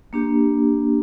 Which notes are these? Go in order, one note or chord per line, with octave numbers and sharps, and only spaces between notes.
A#3 D4 G4